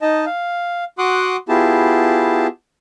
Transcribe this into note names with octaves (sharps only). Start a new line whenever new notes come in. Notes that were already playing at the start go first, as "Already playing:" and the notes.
D#4 D#5 A5
F5
F#4 F#5 C6 D6 D#6 F#6
B3 E4 F4 G4 G#4 A5